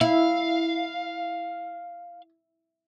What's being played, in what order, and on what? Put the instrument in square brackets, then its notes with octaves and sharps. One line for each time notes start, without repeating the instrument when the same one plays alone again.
[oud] E4 [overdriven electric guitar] F5